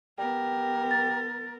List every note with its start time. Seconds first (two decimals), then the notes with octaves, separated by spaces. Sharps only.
0.18 B3 G4 A#4
0.91 A6